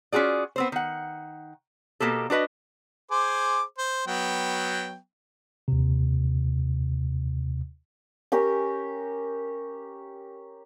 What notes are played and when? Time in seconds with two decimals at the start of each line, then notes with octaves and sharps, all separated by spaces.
0.12 C#4 F4 F#4 G#4 D5
0.56 B3 C4 C5
0.72 D#3 F#5
2.00 B2 A#3 G4 A4
2.30 D4 F#4 B4 D#5
3.11 G#4 C5 D6
3.78 C5
4.07 F#3 B3 G5
5.68 D#2 C3
8.32 C#4 G4 A#4